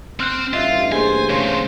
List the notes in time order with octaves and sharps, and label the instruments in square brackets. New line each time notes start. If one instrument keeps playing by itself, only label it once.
[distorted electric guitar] C4 C5 [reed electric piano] C6 F6 F#6
[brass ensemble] A1 G2 [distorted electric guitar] F4 [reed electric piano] D#5 E5
[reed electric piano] A#3 G#4 [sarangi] C5 [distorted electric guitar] G#5
[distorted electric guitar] C#3 A3 [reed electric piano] C#5